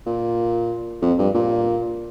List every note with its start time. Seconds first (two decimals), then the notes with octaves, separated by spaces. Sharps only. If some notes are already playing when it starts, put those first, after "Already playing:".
0.06 A#2
1.02 F2
1.18 G2
1.34 A#2